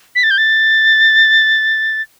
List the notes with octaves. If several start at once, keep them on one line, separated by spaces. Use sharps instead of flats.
B6
A6
G6
A6